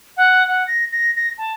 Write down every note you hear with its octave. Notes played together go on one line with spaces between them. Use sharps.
F#5
F#5
A#6
A#6
A#6
A5